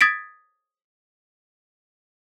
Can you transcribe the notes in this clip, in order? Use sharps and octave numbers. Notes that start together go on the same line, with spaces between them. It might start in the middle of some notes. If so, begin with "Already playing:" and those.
D#6 G#6 A6 B6 D7